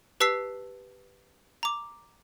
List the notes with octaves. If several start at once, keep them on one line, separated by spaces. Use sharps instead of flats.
G4 B4 A5 E6 B6 C7
A#5 D6